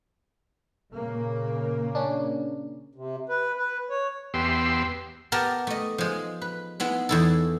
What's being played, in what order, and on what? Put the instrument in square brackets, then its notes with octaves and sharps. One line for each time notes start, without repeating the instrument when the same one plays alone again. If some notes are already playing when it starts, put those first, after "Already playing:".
[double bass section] A#2 C#3 A#3
[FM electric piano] C#4 D4
[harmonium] C3
B4
B4
C#5
[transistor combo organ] E2 B3 G4 C6 E6
[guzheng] B3 G4 A#4 A5
A3 D#5
F3 G#3
B4
G#3 B3 E4
E2 E4 A4